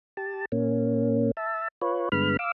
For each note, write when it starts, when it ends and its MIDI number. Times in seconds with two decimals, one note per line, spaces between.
0.17 0.45 67
0.17 0.45 81
0.52 1.31 46
0.52 1.31 58
0.52 1.31 61
1.37 1.68 76
1.37 1.68 81
1.82 2.09 65
1.82 2.09 71
1.82 2.09 73
2.12 2.37 43
2.12 2.37 50
2.12 2.37 56
2.12 2.37 59
2.12 2.37 83
2.12 2.37 89
2.39 2.51 77
2.39 2.51 86
2.39 2.51 88